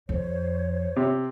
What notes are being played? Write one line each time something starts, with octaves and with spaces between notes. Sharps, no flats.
F2 C5 C#5
C3